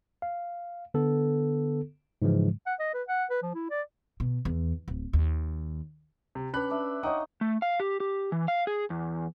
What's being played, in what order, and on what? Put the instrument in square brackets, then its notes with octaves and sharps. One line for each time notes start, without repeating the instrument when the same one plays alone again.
[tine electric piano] F5
D3 B3 A4
G#2 C#3 E3 F3 G#3
[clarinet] F#5
D#5
B4
F#5
B4
F3
E4
D5
[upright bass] B2
E2
D1
D#2
[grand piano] C3
[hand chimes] C#4 B4 [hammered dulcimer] D4 [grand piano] B5 F#6
[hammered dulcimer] D4 E5
[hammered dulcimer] D#4 C#5 D#5 [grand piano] F#5 G5 D#6
[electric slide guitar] A3
F5
G4
G4
E3
F5
G#4
E2